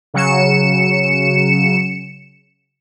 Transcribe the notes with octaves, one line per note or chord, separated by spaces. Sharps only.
C#3 F#3 C#7 E7